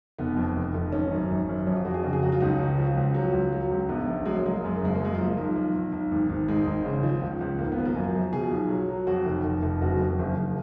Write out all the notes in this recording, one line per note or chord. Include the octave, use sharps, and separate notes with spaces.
F1 B3
F2
F1
F1
G#1 C#4
F#2
G#1
F#2
F2 C#4
F4
F2 F#4
G#4
C#3 F#4
G#4
F#3 F#4
F4
C#2 D#4
C#3
F3
C#2
F#3
C#2
F#3
C#2
A#1 B3
A#1
F#3 G#3
A#3
F#3 G#3
A#3
F#2 G#3
A#3
F#1 G#3
A#3
F#2 G#3
F3 A#3
G#3
B1
B1
B1
B1
G#1
G#1
G#2 G#3
G#1
C#3
F3
C#2
C#2
G#1 A#3
B3
F3
A#3
F#2
F3
B2 G#4
B1
F#3
F#3
F2 F#4
F1
F1
F1
F#1 F#4
F2
F#1
F#1